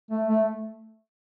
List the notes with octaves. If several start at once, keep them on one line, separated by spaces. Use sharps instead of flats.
A3
A3